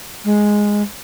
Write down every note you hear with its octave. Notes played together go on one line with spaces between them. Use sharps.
G#3